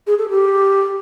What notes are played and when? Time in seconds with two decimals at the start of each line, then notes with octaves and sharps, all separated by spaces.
0.07 G#4
0.18 A4
0.30 G4